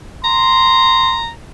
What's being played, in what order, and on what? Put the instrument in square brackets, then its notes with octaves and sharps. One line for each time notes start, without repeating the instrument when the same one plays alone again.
[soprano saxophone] A#5 [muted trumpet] C6